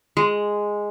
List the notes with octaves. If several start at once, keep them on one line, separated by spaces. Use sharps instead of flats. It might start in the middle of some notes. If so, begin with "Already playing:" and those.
G#3